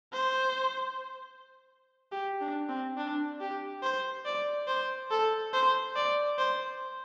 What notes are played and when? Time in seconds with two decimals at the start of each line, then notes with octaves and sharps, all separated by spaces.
0.13 C5
2.12 G4
2.41 D4
2.69 C4
2.97 D4
3.40 G4
3.83 C5
4.25 D5
4.68 C5
5.11 A4
5.53 C5
5.96 D5
6.38 C5